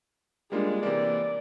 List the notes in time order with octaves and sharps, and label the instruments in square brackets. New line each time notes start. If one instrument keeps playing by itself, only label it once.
[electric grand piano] G3 A#3 F4 [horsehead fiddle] G#3 D4
[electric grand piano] C3 E3 A#3 [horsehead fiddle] D5